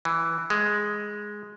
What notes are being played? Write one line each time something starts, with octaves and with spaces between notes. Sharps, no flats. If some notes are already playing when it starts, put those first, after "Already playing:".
E3
G#3